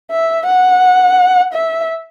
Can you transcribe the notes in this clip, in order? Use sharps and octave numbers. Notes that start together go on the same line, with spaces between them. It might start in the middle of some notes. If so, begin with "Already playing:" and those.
E5
F#5
E5